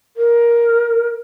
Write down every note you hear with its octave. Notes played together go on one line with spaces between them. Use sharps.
A#4